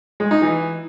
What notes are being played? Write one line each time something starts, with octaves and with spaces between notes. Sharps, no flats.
G#3
D#4
E3